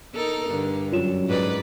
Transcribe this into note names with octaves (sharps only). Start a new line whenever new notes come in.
D#4 A4 A#4
G2 D3
F#2 F4 C#5 E7
G#2 B4 D5